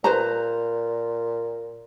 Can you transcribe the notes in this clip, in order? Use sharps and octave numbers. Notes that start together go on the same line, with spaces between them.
A#2 B4 C5 A#5